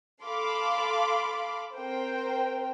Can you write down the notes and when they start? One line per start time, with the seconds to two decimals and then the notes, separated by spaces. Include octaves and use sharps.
0.24 A4 F5 B5 C6 D6
1.75 C4 A#4 C5 G5